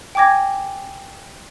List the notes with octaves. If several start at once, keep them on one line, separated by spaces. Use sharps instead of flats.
G5 G#5 D6 G#6 A#6